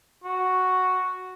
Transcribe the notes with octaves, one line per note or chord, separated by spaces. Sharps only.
F#4